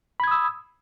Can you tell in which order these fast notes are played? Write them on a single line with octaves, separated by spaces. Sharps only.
B5 G#6 D#6 E6